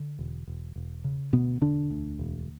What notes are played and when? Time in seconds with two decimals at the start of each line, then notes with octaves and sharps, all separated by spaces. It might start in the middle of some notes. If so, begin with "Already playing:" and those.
Already playing: D3
0.19 E1
0.48 E1
0.76 E1
1.04 C#3
1.33 D2 B2 B3
1.61 E1 D3 D4
1.90 D2
2.19 E1